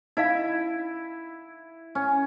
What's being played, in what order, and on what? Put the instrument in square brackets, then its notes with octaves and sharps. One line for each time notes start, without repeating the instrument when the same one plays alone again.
[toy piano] D#4 D#5 F5 [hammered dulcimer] E4
[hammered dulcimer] C#4